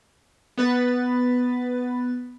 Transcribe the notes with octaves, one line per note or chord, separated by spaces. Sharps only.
B3 B4 A6